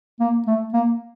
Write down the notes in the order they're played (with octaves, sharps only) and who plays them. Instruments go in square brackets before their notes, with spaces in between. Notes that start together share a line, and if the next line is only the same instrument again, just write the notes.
[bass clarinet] A#3
A3
A#3